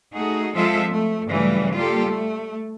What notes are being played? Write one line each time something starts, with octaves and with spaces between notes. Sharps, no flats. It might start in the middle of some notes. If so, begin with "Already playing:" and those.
A3 D#4 F#4 G#4
F3 G#3 C4 F4 A4 E5
A3
G2 C#3 E3 F#3 G3 A3
G3 A#3 F4 G4 A4
A3